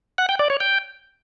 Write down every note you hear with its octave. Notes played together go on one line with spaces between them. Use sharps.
F#5
G5
D5
C#5
G5